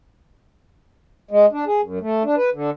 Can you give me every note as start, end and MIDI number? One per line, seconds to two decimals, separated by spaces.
1.31 1.46 56
1.52 1.65 62
1.67 1.81 68
1.82 1.99 42
2.01 2.23 57
2.24 2.35 62
2.37 2.50 71
2.54 2.70 50